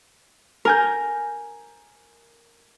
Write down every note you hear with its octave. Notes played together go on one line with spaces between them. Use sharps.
A#4 G#5 G6